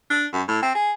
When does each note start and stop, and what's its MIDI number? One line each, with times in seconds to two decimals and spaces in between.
0.10 0.26 62
0.33 0.42 42
0.48 0.60 45
0.62 0.74 60
0.75 0.92 68